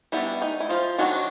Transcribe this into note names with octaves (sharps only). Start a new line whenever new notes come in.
G3 B3 D4 E4
D#4
E4
F3 F4
D#3 F#3 D4 F#4